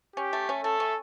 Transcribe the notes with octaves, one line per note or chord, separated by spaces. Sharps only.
C#4 G4
A3
C#4
A3 A4
C#4